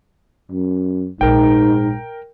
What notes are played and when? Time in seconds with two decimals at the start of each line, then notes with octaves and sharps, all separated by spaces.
0.52 F#2
1.21 A#1 G#2 D#4 A#4 G5